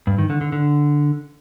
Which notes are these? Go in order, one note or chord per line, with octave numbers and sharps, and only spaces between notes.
G2
D#3
D3
D3
D3